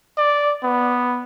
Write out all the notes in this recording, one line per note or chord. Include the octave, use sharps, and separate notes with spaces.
D5
B3